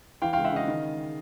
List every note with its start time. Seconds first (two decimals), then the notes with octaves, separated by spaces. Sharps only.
0.22 E3 F5 G5
0.33 C#2 F5 G5
0.45 E5 F#5
0.52 C#3 D#5 F5
0.68 D#3